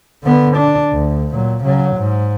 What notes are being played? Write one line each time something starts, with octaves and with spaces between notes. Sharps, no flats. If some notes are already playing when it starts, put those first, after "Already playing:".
D3 B3
D4
D2
A#2 F#3
C#3 F#3
G#2